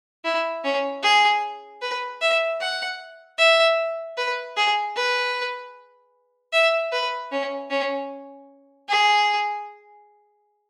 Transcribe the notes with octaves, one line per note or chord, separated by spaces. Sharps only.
E4
C#4
G#4
B4
E5
F#5
E5
B4
G#4
B4
E5
B4
C#4
C#4
G#4